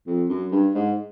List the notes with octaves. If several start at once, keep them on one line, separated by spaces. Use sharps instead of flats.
F2
F#2
G2
G#2